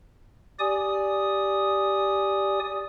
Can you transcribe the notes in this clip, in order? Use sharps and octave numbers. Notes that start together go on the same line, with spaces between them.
G4 D5 G#5 D#6